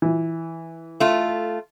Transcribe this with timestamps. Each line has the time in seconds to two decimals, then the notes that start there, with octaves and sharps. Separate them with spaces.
0.02 E3
1.00 A3 F4